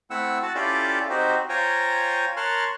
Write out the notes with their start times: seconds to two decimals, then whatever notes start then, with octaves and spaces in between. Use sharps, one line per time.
0.11 A3 C4 E4 F#5 E6
0.43 F#4 A5
0.55 C#4 E4 F4 G4 A4 D5
1.10 C4 D#4 F#4 G4 C5
1.49 F4 C5 C#5 G5 G#5 A#5
2.37 A#4 C#5 A5 C6 F6 F#6